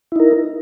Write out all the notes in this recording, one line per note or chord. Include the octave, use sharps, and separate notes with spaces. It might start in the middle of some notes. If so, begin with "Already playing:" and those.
D#4 E4 A#4